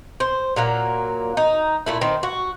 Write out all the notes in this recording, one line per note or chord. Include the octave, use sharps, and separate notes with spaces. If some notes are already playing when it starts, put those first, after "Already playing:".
C5
A#2 F#3 A#3
D#4
A#2 A3 E4
D#3 C4
F#4